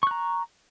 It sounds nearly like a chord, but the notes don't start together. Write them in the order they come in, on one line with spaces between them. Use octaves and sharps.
C#6 F#6 A#5